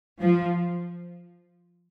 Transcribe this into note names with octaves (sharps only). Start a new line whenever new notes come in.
F3